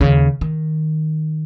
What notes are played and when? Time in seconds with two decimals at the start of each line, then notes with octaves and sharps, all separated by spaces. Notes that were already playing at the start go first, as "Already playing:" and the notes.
0.01 D#2 C#3
0.41 D#3